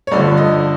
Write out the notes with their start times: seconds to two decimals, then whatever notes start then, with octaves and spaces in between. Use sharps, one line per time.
0.07 C#5
0.11 G2 D3 F3 D5
0.37 D#5